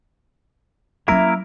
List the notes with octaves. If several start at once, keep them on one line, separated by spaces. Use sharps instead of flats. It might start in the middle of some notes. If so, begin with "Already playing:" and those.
F#3 A#3 C#4 E4 A#4 E5